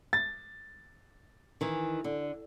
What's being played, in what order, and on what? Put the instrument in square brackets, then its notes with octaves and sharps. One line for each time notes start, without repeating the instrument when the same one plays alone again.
[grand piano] A6
[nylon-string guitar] D#3 E3
D3